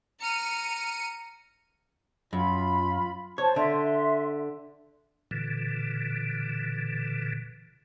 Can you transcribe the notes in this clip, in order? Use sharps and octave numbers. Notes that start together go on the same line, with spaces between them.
A#5 F6 C#7 D#7
F#2 F4 B5
C5 C#5 A5
D3 E5 C6
A#2 D3 E3